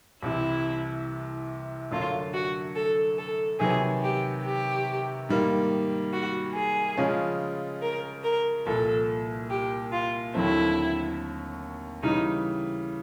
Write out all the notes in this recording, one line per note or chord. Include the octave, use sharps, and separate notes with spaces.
C2 C3 E3 E4
F#2 D3 F#3 A3 D4 F4
F#4
A4
A4
C3 D#3 F#3 B3 G#4
G4
G4
G#2 D#3 G3 A#3
F#4
G#4
C#3 F3 G#3 C#4 F4
A#4
A#4
C2 A#2 F3 A4
G4
F4
D#2 D3 F#3 A3 C4 E4
C#3 E3 G3 D#4